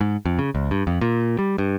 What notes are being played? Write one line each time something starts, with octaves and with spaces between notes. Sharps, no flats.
G#2
F2
C#3
C#2
G2
F2
A#2
G3
G2